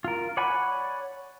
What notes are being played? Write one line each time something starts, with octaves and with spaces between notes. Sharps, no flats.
F4 A#4
C#5 D5 F#5 G#5 B5